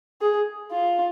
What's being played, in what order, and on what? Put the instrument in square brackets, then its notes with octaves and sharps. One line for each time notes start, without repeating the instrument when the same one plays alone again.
[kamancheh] G#4
F4